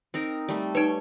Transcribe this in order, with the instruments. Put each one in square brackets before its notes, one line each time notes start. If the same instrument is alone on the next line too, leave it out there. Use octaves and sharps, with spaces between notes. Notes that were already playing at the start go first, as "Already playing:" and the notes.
[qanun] C4 D#4 A#4
G3 A3
[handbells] D#4 B4 [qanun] C#5 G5